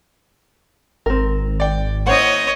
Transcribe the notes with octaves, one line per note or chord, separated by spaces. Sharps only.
G#1 C4 A#4
D5 G5
A#3 C#4 E4 C5 C#5 D#5 F#5